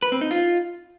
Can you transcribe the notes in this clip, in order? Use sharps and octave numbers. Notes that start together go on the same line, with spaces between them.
B4
C4
D#4
F4